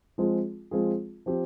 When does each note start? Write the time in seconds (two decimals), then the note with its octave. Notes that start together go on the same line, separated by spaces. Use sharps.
0.18 F3 G#3 C4 F4 G#4
0.71 F3 G#3 C4 F4 G#4
1.26 F3 C4 G4